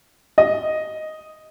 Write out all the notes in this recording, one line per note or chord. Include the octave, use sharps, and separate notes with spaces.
D#5